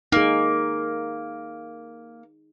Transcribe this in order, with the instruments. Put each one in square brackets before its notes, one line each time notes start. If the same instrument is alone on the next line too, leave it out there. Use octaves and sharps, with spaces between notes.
[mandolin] A#3 [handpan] D#4 G#4